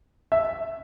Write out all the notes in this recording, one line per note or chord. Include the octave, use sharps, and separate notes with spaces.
E5